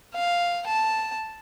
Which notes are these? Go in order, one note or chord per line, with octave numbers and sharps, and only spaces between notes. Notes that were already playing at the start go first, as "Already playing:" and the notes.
F5
A5